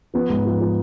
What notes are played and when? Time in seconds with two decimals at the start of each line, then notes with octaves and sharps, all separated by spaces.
0.14 F3 B3
0.29 G#2
0.46 F3
0.61 F3